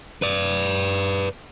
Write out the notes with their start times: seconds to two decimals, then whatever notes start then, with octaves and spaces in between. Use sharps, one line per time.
0.22 B4 D5